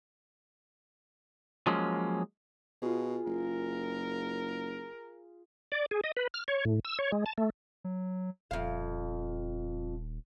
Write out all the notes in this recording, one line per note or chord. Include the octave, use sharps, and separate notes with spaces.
F3 F#3 G#3 A#3 C#4
B2 F4 G#4
F#1 A#4
D5
G#4
D#5
B4
F6
C#5
A2
E6
C#5
G#3
A5
A3
F#3
D#1 F2 F5